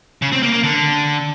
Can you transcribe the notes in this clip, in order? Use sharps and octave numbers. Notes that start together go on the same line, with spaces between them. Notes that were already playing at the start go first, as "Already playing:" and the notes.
C#3
C4
A#3
A#3
D3